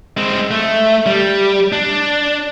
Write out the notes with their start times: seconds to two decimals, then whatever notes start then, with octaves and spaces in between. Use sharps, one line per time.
0.17 G#3 C4
0.51 A3
1.06 G3
1.72 D4